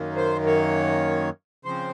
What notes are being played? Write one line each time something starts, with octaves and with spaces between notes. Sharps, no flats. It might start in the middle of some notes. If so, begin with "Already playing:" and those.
Already playing: F#2 D#3 A#3
C5
C#5
C#3 F3 C4 C5